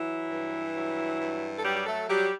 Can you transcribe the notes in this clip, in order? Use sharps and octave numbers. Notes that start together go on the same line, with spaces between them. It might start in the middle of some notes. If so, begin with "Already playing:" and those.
Already playing: E3 F#3 E4
G2
F#3
G2
A4
F#3 G3 G4
G4
A3 A4
F#3 G3 G4